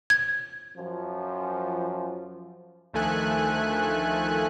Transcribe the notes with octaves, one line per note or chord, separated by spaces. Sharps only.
G#6
F#2 F3
D2 D#3 F3 A3 G#5 F#6